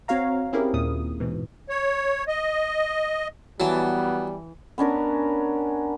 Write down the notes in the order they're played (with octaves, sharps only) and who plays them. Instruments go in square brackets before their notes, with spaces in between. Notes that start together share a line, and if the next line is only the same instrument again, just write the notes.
[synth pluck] C4 F#4 C#5 F5 A#5
C4 C#4 E4 G4 G#4 A#4
D#2 A#2 D#6
G#2 B2 E3
[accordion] C#5
D#5
[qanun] E3 A5 [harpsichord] F#3 [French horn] G3 [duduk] B3
[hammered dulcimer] B3 C#4 D4 A#4